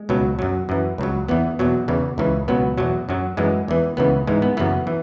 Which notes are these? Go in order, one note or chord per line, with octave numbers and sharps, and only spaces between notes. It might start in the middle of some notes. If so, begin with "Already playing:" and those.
Already playing: G#3
C#2 B2 F#3
F#2 F#3
F#2 E3
C#2 C#3 F#3
E2 E3 B3
E2 B2 F#3
E2 C#3 E3
C#2 C#3 E3
C#2 B2 F#3 B3
E2 B2 F#3
F#2 F#3
F#2 E3 G#3
E2 E3
C#2 C#3 E3 B3
G#2 E3 G#3
B3
F#2 C#3 E3 B3
E3